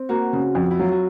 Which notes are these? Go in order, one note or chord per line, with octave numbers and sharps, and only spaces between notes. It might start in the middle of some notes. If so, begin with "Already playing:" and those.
Already playing: C4
A#3 F#4
C#3
F2
E4
F#3 F4
F#4